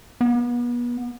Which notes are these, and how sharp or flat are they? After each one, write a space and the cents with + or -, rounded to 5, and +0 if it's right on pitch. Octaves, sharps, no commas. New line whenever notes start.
B3 -35